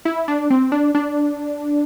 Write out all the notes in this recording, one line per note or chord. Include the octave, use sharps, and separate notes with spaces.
E4
D4
C4
D4
D4